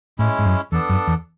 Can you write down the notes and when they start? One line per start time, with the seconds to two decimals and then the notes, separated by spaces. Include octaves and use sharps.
0.19 A2 G#3 C#4 E4
0.39 G#2
0.45 F#2
0.72 E2 B3 D4 A4
0.89 F#2
1.07 E2